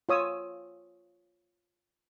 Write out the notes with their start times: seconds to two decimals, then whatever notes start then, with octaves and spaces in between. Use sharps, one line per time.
0.09 F4 C#5 D#6 E6